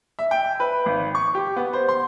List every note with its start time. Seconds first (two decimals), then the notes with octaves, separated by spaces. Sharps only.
0.19 E5
0.31 G5
0.60 B4
0.86 G#1
1.15 C#6
1.35 G4
1.56 B3
1.73 C5
1.89 C6